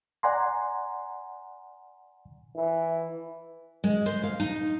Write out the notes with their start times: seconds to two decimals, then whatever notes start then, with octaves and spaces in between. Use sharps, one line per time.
0.23 D5 F#5 G#5 A#5 C6
2.56 E3
3.84 G#3
4.06 C5
4.23 F5
4.40 D#4